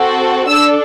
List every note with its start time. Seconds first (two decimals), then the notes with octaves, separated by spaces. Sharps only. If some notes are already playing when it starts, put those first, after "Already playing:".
Already playing: C4 F#4 A4
0.48 D4 A4 E6